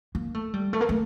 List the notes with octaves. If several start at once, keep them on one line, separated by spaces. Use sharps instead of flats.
A#3
A3
G3
A3
A#3
A3